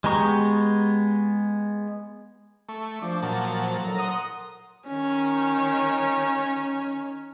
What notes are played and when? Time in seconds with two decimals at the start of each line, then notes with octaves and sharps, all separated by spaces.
0.04 G#3 B3 G4 A#5 C#6
2.69 A3 C#6
3.02 F3 D4
3.22 A#2 F#3 A5
3.84 A2 D3 F#3 A#4
3.99 F#5 C6 D#6
4.88 D#3 C#4